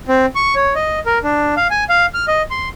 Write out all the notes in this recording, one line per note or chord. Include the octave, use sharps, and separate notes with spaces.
C4
C#6
C#5
D#5
A#4
D4
F5
G#5
F5
F6
D#5
C6